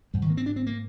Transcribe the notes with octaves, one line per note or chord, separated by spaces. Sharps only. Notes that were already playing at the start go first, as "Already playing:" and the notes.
G#2 G3
D#3
A#3
C4
D4
C4
A#3